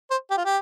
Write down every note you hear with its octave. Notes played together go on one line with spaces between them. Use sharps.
C5
G4
F4
G4